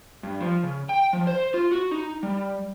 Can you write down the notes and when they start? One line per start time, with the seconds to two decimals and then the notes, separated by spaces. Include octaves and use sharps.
0.23 G2
0.41 F3
0.63 C#3
0.89 G5
1.13 F3
1.27 C5
1.54 F4
1.72 F#4
1.91 D#4
2.23 G3